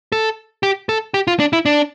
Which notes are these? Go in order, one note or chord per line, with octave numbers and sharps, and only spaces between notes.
A4
G4
A4
G4
F4
D4
E4
D4